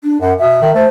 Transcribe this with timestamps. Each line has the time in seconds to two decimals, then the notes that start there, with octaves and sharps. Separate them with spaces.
0.04 D4
0.21 F#2 F#5
0.38 B2 E5
0.62 D#3
0.75 A3 C5